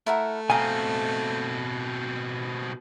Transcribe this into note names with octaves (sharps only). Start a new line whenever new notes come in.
A3 E4 A#4 F#5
B2 C4 D#5 F5 G#5 A#5